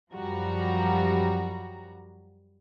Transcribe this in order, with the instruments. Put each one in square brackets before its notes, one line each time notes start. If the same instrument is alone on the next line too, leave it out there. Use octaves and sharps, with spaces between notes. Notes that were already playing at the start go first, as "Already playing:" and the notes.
[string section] F#2 F3 G3 F#4 A#5